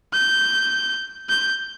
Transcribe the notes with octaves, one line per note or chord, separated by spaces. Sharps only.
G6
G6